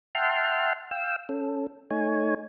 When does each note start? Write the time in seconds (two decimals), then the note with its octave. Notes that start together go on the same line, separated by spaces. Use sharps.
0.15 E5 F#5 G5 A5 C6 F6
0.91 F5 G5 E6
1.29 C#4 A4
1.91 A3 D#4 C#5 G#5